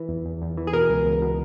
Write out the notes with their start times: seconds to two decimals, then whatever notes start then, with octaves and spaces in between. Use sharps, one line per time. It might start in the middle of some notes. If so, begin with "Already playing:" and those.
Already playing: E3
0.09 E2
0.25 E2
0.42 E2
0.57 E3
0.67 G#4
0.73 B2 A#4
0.89 C#2
1.06 C#2
1.22 B2